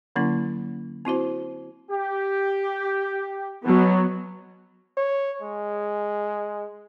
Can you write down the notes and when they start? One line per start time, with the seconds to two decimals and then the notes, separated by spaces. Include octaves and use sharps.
0.16 D3 F#3 A#3 C#4 E4
1.05 C4 E4 F#4 C5
1.89 G4
3.65 B2 F#3 B3
4.97 C#5
5.41 G#3